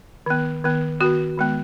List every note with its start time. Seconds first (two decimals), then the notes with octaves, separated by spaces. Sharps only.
0.26 D#3 B3
0.64 D#3 B3
1.01 D#3 B3 F#4
1.37 D#3 G#3 B3